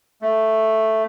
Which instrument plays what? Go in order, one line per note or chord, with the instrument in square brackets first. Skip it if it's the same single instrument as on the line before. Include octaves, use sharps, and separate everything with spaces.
[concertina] A3